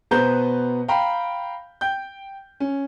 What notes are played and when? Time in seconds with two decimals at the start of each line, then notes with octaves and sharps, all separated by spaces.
0.11 B2 B3 B4 C5 A#5 G6
0.88 F5 G5 A#5 B5
1.81 G5 G6
2.60 C#4